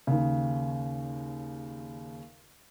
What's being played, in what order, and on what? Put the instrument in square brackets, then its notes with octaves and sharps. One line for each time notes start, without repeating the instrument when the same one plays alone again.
[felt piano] D#2 C#3